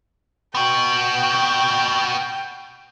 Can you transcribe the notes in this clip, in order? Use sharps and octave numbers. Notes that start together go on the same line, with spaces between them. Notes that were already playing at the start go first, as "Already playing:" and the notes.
B3 F#4 G5